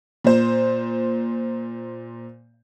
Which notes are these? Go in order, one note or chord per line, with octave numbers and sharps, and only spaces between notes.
A#2 C5